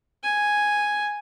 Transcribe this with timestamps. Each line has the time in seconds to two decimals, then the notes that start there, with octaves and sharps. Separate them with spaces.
0.23 G#5